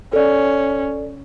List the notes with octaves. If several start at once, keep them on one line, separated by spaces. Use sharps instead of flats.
C#4 A4 D5